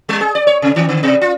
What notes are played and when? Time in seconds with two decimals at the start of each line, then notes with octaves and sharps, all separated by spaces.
0.09 G3
0.21 G#4
0.35 D5
0.47 C#5
0.62 C3
0.76 D#3
0.89 D3
1.03 B2
1.21 F4